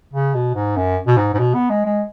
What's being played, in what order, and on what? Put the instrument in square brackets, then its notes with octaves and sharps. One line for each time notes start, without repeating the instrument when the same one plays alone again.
[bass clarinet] C#3
B2
G#2
F#2
B2
G#2
G#2
B2
B3
G#3
G#3